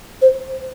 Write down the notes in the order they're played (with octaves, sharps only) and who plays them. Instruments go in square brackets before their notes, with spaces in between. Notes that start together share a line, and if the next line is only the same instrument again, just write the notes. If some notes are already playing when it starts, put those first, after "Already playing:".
[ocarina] C5